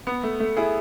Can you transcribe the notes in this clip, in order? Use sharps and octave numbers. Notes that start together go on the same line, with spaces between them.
B3
A3
A3
E4 G#4